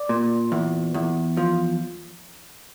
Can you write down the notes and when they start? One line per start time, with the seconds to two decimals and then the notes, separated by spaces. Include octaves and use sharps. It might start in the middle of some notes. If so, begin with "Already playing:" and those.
Already playing: D5
0.09 A#2
0.52 E2
0.94 E2
1.37 F3